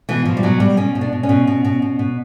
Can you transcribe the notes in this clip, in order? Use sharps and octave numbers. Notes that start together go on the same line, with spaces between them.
B2 E3
B2 F3
G3
B2 F#3
B2 G3
B2 C#4
B2
D4
B2
C#4
B2
B2
B2
B2
B2